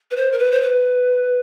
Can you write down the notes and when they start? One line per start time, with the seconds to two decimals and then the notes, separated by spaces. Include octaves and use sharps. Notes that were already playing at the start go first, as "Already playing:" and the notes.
0.11 B4
0.16 C5
0.32 A#4
0.38 B4
0.52 C5
0.61 B4